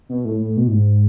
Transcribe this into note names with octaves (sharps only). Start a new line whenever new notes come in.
B2
A2
A2
B2
A2
G#2